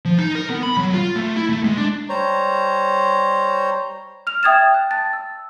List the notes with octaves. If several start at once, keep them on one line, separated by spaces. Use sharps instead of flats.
F3
D#4
A#4
B3
B5
F#3
F4
A3
E4
A3
G#3
D4
G3 C5 C#5 A#5
F6 F7
E5 G5 D#6 G#6 A6 E7
F#6
A5 A6
E6